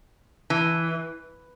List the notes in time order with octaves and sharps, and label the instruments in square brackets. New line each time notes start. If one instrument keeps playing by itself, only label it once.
[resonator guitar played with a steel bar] E3